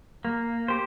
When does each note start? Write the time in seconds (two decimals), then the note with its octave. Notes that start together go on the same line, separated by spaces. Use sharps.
0.25 A#3
0.68 G4 C5